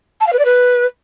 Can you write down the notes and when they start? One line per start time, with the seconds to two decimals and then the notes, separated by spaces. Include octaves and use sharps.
0.20 A5
0.26 F5
0.33 B4
0.39 D5
0.45 B4